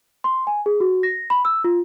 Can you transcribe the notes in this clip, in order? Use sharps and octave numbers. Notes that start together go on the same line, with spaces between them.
C6
G#5
G#4
F#4
A#6
B5
E6
F4